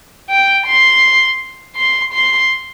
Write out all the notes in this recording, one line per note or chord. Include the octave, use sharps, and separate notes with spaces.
G5
C6
C6
C6